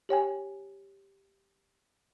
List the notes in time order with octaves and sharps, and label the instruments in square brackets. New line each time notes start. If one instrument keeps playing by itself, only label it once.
[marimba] G4 C#5 G5 G#5